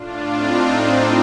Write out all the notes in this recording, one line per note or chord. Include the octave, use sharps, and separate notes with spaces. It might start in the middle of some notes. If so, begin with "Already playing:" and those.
Already playing: A2 D4 F4
C4 D#4